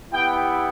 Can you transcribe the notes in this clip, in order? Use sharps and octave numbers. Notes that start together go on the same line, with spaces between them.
B3 E4 G4 G5